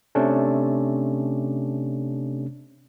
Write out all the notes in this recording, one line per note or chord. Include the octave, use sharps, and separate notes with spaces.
C3 A3 C#4 D4